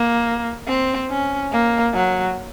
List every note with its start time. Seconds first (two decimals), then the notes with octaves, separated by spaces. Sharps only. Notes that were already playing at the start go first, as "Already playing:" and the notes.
Already playing: A#3
0.68 C4
1.10 C#4
1.52 A#3
1.94 F#3